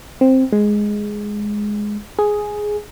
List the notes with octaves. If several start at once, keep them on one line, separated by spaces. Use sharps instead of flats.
C4
G#3
G#4